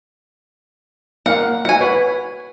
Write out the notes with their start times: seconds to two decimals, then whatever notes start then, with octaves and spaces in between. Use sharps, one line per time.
1.26 A#3 F5 F#5
1.65 F#4 F#5 G#5
1.81 B4 C#5 B5